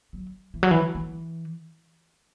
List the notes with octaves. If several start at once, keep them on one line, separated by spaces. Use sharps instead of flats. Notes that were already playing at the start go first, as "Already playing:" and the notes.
F#3
E3
F#3
E3
E3